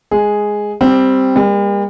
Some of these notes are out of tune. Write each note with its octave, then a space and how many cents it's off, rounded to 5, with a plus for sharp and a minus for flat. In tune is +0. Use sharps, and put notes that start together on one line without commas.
G#3 +0 G#4 +0
G3 +0 C4 +0
G3 +45 A#3 +30